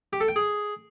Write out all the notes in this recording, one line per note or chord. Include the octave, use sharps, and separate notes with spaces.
G4
A4
G5
G#4